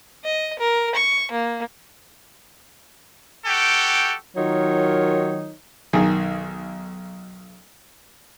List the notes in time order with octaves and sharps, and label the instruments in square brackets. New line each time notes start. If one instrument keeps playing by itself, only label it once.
[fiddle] D#5
A#4
C#6
A#3
[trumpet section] F#4 G4 A4 G5
[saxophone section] D#3 F#3 D#4 F4 A#4 C#5
[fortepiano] B1 D#3 G#4